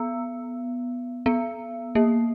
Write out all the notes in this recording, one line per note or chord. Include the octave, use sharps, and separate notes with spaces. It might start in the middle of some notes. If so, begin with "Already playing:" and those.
Already playing: B3
B3
A#3